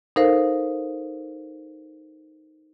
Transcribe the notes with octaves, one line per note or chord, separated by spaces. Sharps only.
D#4 A4 A#4 C5 F5